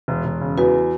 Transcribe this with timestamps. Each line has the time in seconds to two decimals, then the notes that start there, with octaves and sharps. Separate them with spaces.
0.08 E1
0.25 E1
0.41 C#3
0.58 E2 F#4 B4